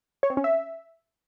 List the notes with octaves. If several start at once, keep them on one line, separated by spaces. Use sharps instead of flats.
C#5
C4
C#4
E5